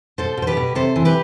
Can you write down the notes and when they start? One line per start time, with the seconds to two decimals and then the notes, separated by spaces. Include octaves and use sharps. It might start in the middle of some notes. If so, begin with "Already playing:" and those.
0.18 B2 A4 C5
0.37 B2 C5
0.47 G4 B4
0.57 B2
0.75 C3 A4 C5
0.96 E3
1.05 G4 B4